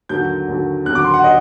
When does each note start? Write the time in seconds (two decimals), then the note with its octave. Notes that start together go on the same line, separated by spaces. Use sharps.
0.09 D#2 D3 F#3 G6
0.48 D#2 D3 F#3
0.85 D#2 D3 F#3 F#6
0.95 D6
1.04 C6
1.14 F#5
1.24 D#5